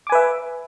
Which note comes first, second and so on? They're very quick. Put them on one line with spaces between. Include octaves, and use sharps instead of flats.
D6 G#5 B4 E5